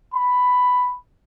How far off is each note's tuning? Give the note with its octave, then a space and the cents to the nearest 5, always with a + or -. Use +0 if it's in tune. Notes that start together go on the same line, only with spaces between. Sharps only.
B5 +5